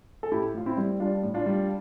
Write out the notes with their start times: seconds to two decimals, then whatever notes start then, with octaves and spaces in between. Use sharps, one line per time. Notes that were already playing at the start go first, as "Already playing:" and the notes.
0.23 A4
0.31 A2 E4 G4
0.54 A2 F4
0.66 C4 E4
0.77 G3
1.00 G3 D4 F4
1.23 A2
1.34 D4 F4
1.46 G3